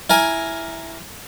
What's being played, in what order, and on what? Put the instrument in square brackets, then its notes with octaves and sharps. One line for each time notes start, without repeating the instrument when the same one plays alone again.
[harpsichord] E4 A#4 G#5